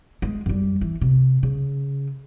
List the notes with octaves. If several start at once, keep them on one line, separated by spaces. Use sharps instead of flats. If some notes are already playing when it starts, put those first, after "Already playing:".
G#3
F#2 G3
E3
C3
C#3